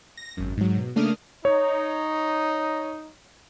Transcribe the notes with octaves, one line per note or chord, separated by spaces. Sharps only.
A#6
G#1 F#2
G#2 F#3
B2
C#3 A3 A#3 D4 D#6 F6
D#4 C#5